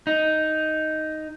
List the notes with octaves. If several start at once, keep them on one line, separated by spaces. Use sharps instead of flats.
D#4